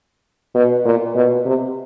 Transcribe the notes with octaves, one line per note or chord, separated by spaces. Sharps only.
B2
A#2
B2
C3